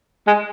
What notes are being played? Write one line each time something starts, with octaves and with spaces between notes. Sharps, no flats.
G#3